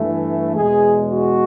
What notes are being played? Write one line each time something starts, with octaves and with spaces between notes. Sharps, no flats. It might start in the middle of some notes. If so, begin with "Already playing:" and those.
Already playing: G2 E3 A3
E2 B2 G#3 G#4
F#4